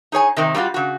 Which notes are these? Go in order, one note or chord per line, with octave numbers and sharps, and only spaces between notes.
D#4 G#4 C#5 G#5
C3 D#3 C4
G3 D#4 F4 F#4
C#3 F#4